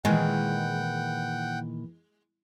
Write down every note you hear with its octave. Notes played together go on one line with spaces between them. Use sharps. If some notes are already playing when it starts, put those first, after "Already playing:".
A#2 D#3 E3 G#3 F#5 G5